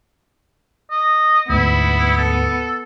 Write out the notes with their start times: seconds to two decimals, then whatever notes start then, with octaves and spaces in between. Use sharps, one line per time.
0.91 D#5
1.50 D2 G#2 B3 E4
2.18 A4